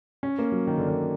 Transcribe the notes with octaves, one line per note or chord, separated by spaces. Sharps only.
C#4
A#3
F#3
D#3
D3
D#3